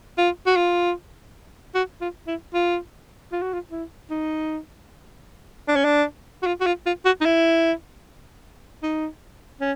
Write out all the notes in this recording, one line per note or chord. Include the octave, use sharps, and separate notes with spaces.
F4
F#4
F4
F#4
F4
E4
F4
F4
F#4
F4
E4
D#4
D4
C#4
D4
F#4
F4
F#4
F4
F4
F#4
D#4
E4
D#4
C#4